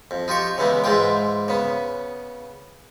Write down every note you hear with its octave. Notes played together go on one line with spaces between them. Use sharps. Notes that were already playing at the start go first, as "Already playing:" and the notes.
F2
D#4 F4 G4 C#6
C#3 E3 G#3 B3
G#2 E3 G#3 F4 G5
C#3 B3